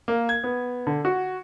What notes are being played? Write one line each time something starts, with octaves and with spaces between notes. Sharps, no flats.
A#3
G#6
B3
D3
F#4